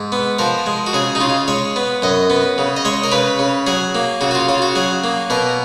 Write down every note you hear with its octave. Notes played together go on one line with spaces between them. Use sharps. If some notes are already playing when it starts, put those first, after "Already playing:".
Already playing: G#2
B3
F3 A#4
G#3
F#4
C#3 G#4
D#4
C#3 F4
G#3 C#5
B3
F#2 D#5
B3
C#3
D#5
G#3 C#5
A#4
C#3 B4
C#3
F#3 G#4
A#3
C#3 F#4
F#4
F4
C#3 F4
F#4
F#3 G#4
A#3
B2 A#4